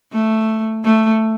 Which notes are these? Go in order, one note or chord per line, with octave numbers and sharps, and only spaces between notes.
A3
A3